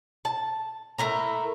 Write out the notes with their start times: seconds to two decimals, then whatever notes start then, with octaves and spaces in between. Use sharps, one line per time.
0.25 A5
0.98 A3 E4 A#4 A#5